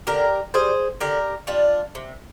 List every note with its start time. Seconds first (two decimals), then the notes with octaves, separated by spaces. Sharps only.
0.07 D3 G4 A#4
0.54 G3 G#4 C5
1.01 D3 G4 A#4
1.47 G3 D4 F4
1.95 C3